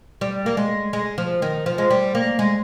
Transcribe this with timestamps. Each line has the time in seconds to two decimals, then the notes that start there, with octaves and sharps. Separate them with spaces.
0.21 G3
0.46 A#3
0.57 G#3
0.93 G#3
1.18 F3
1.42 D#3
1.66 F3
1.78 G#3
1.90 G3
2.15 A#3
2.39 G#3